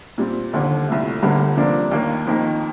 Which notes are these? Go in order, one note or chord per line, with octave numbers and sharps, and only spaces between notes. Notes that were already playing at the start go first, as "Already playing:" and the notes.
A#2 G3 C4
F1 D#2 D3
C2 A#2 A3
G1 G2 D3 G3 A#3
C3 F3 A#3 D4
D#2 D#3 A#3
F2 D#3 A#3 D#4